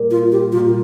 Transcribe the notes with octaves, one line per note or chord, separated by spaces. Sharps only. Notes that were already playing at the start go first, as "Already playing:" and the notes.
Already playing: A#2 G3 A#3
F4
G4
A#2 G3 A#3 F4